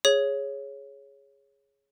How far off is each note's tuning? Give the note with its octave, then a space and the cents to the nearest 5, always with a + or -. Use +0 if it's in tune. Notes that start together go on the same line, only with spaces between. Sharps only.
G#4 +0 C#5 +0